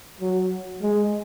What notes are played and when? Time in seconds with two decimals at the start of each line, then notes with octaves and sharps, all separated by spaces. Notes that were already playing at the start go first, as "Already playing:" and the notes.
0.20 F#3
0.82 G#3